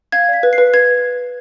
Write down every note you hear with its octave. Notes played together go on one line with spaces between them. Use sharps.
F5 G#6
D5 B6
B4
C7
B4
B4 G#6